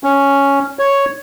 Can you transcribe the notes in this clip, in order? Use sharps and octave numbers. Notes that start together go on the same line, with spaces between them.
C#4
C#5